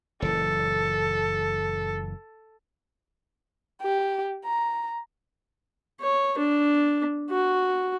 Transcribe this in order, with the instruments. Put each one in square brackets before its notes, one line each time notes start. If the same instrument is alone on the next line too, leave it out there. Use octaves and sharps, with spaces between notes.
[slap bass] F#1 A#2 E3 [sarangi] A4
[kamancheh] G4
A#5
[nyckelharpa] C#5
D4
F#4